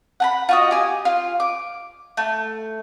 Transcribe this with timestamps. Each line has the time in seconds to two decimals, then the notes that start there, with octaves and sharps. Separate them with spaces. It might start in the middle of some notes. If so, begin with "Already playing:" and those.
0.20 F#5 A5 B5
0.49 F4 F#4 D#5
0.71 G4 G#5
1.05 F4
1.40 D6
2.17 A3